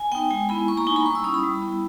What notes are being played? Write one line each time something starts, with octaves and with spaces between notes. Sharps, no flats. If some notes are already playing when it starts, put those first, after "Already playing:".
Already playing: G#5
B3 D#4 G5
G#3 G#5
B3 E4 B5
A#3 C#6
A#5
D#4 G#5
B5
G3 C#6
E6
C#4 E4 D#6
B5
G3
B3 E4